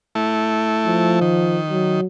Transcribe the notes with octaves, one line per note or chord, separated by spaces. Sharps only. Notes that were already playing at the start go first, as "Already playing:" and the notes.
A3 E4
F3
D#3
F#3